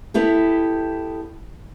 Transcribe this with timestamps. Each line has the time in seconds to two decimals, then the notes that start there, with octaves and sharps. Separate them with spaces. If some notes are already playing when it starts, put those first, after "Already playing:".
0.14 B3 E4 G4 A4